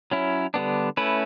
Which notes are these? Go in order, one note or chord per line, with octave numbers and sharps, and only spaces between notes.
F#3 C#4 E4
D3 G3 B3 D4
A3 C#4 E4 B4